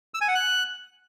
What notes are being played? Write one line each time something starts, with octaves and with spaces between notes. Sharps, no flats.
E6
G#5
F#5
F#6